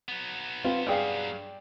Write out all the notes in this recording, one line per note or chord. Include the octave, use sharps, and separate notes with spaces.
F#3 B3
C4 F4 B4
G2 G#4 D5 F5 G5